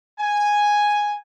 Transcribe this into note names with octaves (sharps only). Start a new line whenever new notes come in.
G#5